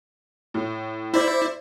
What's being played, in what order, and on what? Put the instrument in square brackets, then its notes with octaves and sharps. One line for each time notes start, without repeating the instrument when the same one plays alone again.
[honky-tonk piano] A2
[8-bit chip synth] E4 [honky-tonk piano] C5 D5 E5